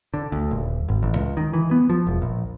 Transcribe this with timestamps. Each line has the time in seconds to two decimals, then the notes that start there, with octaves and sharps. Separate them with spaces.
0.14 D3
0.32 D2
0.51 D#1
0.89 G#1
1.03 A1
1.15 C#2
1.37 D#3
1.53 E3
1.71 B3
1.90 F3
2.07 E1
2.22 A#1